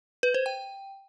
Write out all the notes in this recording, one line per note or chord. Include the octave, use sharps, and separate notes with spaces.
B4
C5
G5